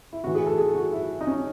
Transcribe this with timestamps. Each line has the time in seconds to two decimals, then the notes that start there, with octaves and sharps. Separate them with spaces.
0.13 E4
0.24 A2 E3 F#4
0.35 G#4
0.47 A4
0.58 G#4
0.75 F#4
0.92 E4
1.21 D#4
1.27 C#4